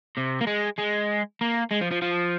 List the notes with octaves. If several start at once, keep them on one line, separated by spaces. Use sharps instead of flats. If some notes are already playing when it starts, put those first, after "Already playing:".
C3
A#3
G#3
G#3
A#3
G#3
F3
F3
F3